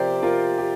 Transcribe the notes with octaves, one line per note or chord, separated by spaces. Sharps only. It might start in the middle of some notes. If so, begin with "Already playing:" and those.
Already playing: C3 F3 G4 A#4 C5 D5
F4 A#4
G4